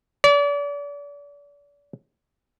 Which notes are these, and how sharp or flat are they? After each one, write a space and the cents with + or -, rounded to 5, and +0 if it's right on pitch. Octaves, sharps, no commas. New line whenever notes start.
D5 -35